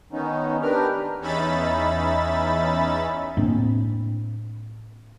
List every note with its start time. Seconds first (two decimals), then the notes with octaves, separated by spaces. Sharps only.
0.13 D#3 B3 C#4 D#4
0.62 D4 G4 A#4 B4 F6
1.20 E2 C#4 D#4 E5 B5 A6
3.37 A2 A#3 C4 D4